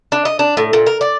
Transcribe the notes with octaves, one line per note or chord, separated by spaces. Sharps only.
D4
D#5
D4
A2
A#2
A#4
D5